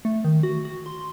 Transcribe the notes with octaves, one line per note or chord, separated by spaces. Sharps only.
A3
D#3
F#4
F#4
C6